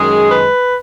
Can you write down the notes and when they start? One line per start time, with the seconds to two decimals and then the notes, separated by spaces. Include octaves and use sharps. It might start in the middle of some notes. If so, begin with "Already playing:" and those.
Already playing: F#2 D#3 G#3 G#4
0.31 B4